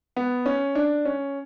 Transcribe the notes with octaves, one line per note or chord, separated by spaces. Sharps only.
B3
C#4
D4
C#4